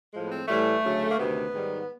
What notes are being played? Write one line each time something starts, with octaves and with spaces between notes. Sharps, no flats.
A2 F3 G#3
B3
C4
A2 E3 G3 A3
D2 C#3 F#3
A#3
D2 C3 D#3 B3
G#2 D#3 G3